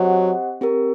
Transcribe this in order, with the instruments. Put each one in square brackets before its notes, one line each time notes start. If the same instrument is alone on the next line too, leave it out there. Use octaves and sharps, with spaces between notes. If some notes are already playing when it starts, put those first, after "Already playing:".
Already playing: [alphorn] F#3 [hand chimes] C4 G4 C5 D#5 F#5
[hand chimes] C4 G4 A#4